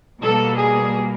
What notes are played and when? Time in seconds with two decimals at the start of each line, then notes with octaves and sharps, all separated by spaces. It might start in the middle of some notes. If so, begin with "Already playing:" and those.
0.23 B2 G3 A#3 A4
0.59 G#4